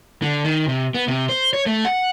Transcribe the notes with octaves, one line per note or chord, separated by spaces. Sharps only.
D3
D#3
C3
B3
C3
C5
C#5
A3
F#5